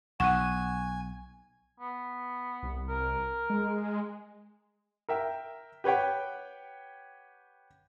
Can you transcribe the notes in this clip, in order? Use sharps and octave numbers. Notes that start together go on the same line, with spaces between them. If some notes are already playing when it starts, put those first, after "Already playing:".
B1 F#5 G#5 C#6 F#6 D#7
B3
C2
A#4
G#3
A#4 E5 G5
G4 B4 C#5 F#5 G5